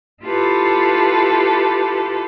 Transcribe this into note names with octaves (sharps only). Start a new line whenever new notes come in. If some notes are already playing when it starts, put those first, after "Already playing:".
E4 F4 G4 A4 B4